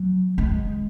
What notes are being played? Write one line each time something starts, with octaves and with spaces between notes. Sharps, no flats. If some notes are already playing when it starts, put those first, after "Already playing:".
Already playing: F#3
G#3